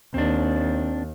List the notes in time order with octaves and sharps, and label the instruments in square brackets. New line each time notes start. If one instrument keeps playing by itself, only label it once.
[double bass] D#2 [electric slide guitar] C4 D4